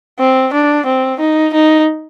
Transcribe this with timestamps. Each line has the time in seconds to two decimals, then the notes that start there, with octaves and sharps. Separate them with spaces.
0.19 C4
0.53 D4
0.86 C4
1.20 D#4
1.54 D#4